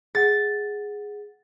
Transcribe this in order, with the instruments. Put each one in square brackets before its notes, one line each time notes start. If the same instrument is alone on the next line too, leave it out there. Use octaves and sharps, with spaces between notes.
[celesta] G#4 F#5 [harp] A6